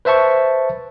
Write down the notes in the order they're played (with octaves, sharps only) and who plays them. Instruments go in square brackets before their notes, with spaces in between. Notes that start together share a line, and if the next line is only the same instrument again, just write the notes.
[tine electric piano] B4 C5 E5 A5 C#6